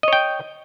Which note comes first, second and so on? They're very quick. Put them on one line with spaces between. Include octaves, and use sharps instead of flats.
D#5 C#5 G5